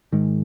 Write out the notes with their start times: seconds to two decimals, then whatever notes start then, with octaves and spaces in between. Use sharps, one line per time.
0.13 G#2 D#3 G#3